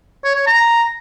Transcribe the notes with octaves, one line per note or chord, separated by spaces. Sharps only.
C#5
C#5
A#5